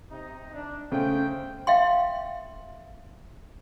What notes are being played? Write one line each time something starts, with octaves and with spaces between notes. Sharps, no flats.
C3 D#4
D4
C#3 A3 C5 G5
E5 F5 G5 C6